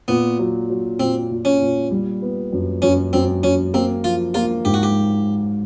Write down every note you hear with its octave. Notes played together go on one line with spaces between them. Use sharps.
A#2 B3
F#3
F#3
A#2 C4
A#2
C#4
A#2
G3
B3
F#2
F#2 C#4
F#2 C4
F#2 C#4
A#3 C4
F3 F4
A#3 F4
G#2 G4
F#4
G4